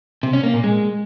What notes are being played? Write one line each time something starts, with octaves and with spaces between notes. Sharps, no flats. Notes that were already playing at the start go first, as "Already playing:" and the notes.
C3
C#4
A#3
A#2
G#3